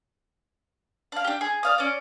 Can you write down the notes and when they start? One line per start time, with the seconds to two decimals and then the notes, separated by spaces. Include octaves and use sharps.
1.12 D4 F5
1.25 D4 G4
1.41 G#4
1.63 D5 F5 D#6
1.78 C#4 D5